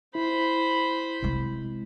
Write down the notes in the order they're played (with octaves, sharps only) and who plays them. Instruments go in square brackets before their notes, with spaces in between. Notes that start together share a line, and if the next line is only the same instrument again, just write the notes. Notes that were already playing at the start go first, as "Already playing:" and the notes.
[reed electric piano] E4 [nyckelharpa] C5 B5
[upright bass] C3 G#3